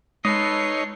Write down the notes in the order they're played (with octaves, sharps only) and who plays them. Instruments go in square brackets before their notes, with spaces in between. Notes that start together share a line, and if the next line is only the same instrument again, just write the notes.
[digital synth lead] G#3 [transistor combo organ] D#4 C#5 [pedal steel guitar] A4 B4 D#5 [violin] C7